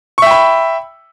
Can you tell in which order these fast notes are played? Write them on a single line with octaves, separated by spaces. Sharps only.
C#6 E5 G5 B5